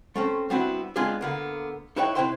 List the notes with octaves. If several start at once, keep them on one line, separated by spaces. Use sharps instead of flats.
A3 C4 C#4
G3 B3 C4 D4 E4 F#4
G#3 B3 C4 D4 F4 G#4
D3 A#3 B3
D#4 E4 B4 C#5 D#5 G5
C3 E4 B4 C5 G5 C6